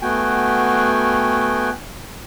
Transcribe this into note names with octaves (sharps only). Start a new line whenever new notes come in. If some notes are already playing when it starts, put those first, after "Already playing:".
A3 B3 F#4 G5 G#5